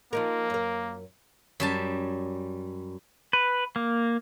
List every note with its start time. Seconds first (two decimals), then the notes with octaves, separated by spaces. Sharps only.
0.13 F3 A#3 D#4 A#4
0.50 F#2 A#4
1.60 F#2 G3 A5
3.33 B4
3.76 A#3